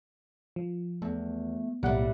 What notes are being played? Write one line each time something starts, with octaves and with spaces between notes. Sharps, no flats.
F3
E2 A3
B1 A2 G3 A#3 F#5